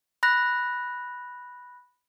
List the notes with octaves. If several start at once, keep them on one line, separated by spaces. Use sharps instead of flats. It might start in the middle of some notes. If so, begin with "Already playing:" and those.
B5 F#6 A#6